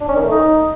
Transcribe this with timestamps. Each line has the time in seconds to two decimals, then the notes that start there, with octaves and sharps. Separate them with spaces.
0.01 D4
0.08 C#4
0.16 D#3
0.24 A3
0.31 D#4